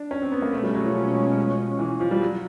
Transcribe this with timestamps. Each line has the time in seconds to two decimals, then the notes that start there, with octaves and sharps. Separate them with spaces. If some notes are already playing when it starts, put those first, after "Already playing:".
Already playing: D4
0.11 C#4
0.22 C4
0.32 B3
0.42 A#3
0.53 B2 G#3 A3 C#4
0.63 G3
0.75 F#3
0.85 F3
1.79 E3
2.00 F3
2.11 G3
2.21 F#3